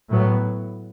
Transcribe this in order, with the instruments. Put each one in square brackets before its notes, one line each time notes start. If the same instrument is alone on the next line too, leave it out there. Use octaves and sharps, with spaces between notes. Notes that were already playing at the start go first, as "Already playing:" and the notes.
[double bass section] A2 F#3 B3